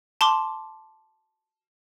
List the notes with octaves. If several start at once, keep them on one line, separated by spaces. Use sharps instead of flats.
A5 C6 D6